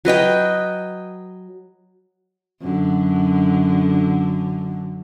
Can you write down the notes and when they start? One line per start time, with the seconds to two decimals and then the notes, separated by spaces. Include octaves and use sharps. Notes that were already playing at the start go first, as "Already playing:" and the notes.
0.05 F#3 B4 D#5 G5
2.62 F#2 D3